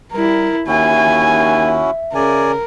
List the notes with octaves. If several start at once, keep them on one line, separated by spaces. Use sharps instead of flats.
G3 E4 A#4
D#2 C#4 E4 F#4 E5 G#5
C#3 A#4 D5 G#5